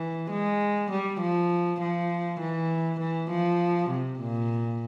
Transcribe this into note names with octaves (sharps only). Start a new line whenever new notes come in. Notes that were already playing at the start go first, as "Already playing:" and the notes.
Already playing: E3
G#3
G3
F3
F3
E3
E3
F3
C3
A#2